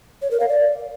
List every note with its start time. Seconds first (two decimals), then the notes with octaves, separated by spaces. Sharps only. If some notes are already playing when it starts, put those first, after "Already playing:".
0.22 C#5
0.31 A#4
0.40 F5
0.49 D5